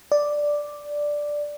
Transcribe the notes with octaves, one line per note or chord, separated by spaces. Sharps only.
D5